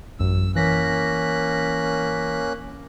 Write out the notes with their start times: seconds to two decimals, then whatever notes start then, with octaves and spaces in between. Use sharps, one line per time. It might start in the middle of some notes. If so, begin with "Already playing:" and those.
0.19 A1 F#2 E6
0.56 E3 A#3 C#4 F#6 A#6 B6